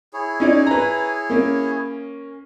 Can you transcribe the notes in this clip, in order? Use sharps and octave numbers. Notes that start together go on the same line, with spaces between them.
E4 G#4 C#5
C#4 D#4 D5
B4 A#5
A#3 C#4